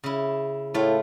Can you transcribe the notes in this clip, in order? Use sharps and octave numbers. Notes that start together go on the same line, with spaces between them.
C#3 E4
A2 A3 F4